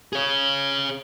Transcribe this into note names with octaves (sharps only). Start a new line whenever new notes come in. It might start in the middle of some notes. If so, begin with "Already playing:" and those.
G#4 C#5